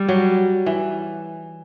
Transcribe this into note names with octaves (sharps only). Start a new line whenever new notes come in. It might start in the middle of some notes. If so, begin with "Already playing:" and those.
Already playing: G3
F#3
E3